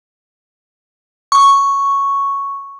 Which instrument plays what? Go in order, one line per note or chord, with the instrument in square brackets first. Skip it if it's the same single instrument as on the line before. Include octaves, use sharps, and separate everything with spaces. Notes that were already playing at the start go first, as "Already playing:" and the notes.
[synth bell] C#6